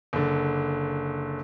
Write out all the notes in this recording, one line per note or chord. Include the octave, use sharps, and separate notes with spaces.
F#1 D3